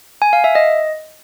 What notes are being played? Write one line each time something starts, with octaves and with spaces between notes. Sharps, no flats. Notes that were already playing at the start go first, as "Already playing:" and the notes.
G#5
F5
E5
D#5